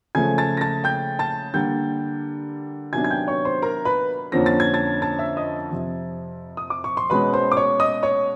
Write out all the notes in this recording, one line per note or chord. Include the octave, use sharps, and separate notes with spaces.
C#3 F3 A3 G#5 G#6
A5 A6
A#6
A5 A6
G5 G6
A5 A6
D3 G3 A#3 G5 G6
C3 D#3 F#3 B3 D4 G#5 G#6
G#6
G5 G6
C#5 C#6
C5 C6
A#4 A#5
B4 B5
F2 D3 F3 A#3 C#4 A#6
A6
G#6
A5 A6
A5 A6
E5 E6
D#5 D#6
F2 C3 F3
D#6
D6
C#6
C6
B2 G#3 C#4 B4 B5
C5 C6
D6
C#5 C#6
D#5 D#6
C#5 C#6